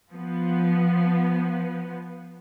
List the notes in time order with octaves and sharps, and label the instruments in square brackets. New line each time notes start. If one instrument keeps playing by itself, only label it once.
[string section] F3 B3